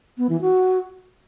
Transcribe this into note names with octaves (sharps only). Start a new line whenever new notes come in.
B3
E3
F#4